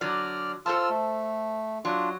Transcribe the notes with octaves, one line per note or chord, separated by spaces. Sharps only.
D3 F#3 D5 F6
F4 A4 C5 A5 E6 F6
A3
F#3 D4 F4